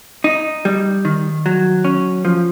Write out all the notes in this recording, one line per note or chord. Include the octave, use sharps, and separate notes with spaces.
D#4
G3
D#3
F#3
C#4
F3